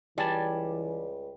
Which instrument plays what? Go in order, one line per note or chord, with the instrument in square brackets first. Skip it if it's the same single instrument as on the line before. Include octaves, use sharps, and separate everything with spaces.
[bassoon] C#2 [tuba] E3 [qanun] G3 [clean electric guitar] D5 G#5 A5